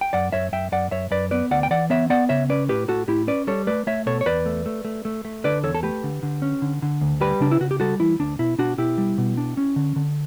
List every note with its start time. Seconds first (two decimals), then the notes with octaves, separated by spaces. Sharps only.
0.01 G5
0.13 F#2 D5 F#5
0.32 F#2 C#5 E5
0.52 F#2 E5 G5
0.72 F#2 D5 F#5
0.91 F#2 C#5 E5
1.11 F#2 B4 D5
1.31 B3 B4 D5
1.51 D2 D5 F#5
1.63 G5
1.70 E3 D5 F#5
1.90 B3 C#5 E5
2.10 B3 D5 F#5
2.29 C#3 C#5 E5
2.49 C#4 B4 D5
2.69 A2 G4 B4
2.88 A2 F#4 A4
3.08 A2 E4 G4
3.27 C#4 B4 D5
3.47 G3 A4 C#5
3.67 A3 B4 D5
3.87 A3 C#5 E5
4.06 B2 A4 C#5
4.21 C#5
4.26 E2 B4 D5
4.46 A3
4.66 A3
4.85 A3
5.05 A3
5.25 A3
5.44 D3 B4 D5
5.63 E2 A4 C#5
5.75 A4
5.83 A3 G4 B4
6.04 D3
6.23 D3
6.42 C#4
6.62 D3
6.82 D3
7.01 D2
7.21 G3 G4 B4
7.40 C#3 D4
7.52 E4
7.60 C#3 F#4
7.71 G4
7.80 G3 F#4 A4
8.00 E3 E4
8.20 D2 D4
8.39 B2 E4
8.58 B2 D4 F#4
8.78 B2 E4 G4
8.98 G3
9.18 B2
9.37 D4
9.57 C#4
9.76 D3
9.96 D3